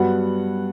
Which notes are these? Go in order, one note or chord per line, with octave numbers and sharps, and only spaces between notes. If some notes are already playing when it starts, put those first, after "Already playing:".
Already playing: G2 F#3 B3 F#5